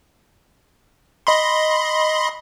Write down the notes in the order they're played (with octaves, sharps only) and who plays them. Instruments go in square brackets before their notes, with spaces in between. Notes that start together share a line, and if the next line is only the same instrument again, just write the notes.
[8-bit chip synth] D#5 B5 C6